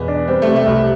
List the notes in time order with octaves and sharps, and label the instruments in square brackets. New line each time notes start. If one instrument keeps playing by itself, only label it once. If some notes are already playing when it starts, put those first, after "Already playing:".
Already playing: [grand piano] E2 B2 [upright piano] B3
[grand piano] D4
[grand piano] G3 [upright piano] C4
[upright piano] A3
[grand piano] C3
[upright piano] A3
[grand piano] C2 [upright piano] G3